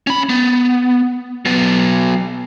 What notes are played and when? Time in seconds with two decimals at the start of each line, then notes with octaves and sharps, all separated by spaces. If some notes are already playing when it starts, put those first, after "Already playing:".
0.07 C#4 B5
0.29 B3
1.45 F#3 B3